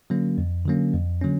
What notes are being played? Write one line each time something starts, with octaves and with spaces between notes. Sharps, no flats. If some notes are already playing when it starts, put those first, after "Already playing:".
D3 F#3 A#3 C#4
F2
D3 F#3 A#3 C#4
F2
D3 F#3 A#3 C#4